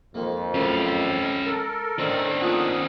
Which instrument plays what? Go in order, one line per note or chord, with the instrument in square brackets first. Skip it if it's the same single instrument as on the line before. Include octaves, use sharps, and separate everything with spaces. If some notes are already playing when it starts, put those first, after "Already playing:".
[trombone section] F2 [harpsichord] D#3 G#3 A#3
[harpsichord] F#2 A2 [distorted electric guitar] C#4 B4
[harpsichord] G#3 G5
[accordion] A4 A#4
[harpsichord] A2 [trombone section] D#3 D4 [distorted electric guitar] C#4 C5
[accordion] F2 F#5 D#6 [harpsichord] F3 A#3